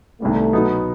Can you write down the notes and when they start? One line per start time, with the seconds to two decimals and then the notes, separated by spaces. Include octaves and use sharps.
0.20 C2 C3 D#3 G3 A3 B3
0.53 B2 F#3 B3 D#4